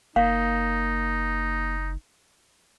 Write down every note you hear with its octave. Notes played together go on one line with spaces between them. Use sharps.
F#1 A#3 D#4 F5